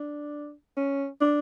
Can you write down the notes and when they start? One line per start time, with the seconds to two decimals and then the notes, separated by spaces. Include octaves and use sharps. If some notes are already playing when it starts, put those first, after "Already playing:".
Already playing: D4
0.77 C#4
1.21 D4